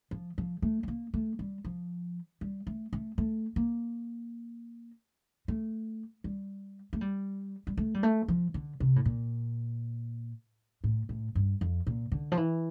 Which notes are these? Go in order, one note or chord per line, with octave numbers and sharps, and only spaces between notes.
F3
F3
A3
A3
A#3
A3
G3
F3
G3
A3
A3
A3
A#3
A3
G3
A3
G3
G3
A3
G3
A3
F3
D3
C3
A2
A#2
A2
A2
G2
F2
A#2
D3
F3
E3